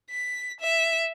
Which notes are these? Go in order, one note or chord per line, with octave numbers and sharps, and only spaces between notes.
B6
E5